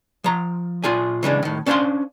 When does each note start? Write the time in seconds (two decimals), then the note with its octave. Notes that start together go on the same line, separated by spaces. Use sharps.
0.24 F3 A#5
0.84 A#2 F4 G#4 G#5
1.23 C#3 E3 G#3 D4
1.43 A2 D#3
1.66 C#4 D4 C5 E5 F5 C6